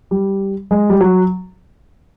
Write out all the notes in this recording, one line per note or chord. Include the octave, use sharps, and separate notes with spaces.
G3
G#3
G3
F#3